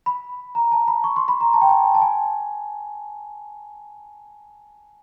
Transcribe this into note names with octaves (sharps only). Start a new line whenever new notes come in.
B5
A#5
A5
B5
C#6
C6
B5
A#5
A5
G5
G#5
A5
G#5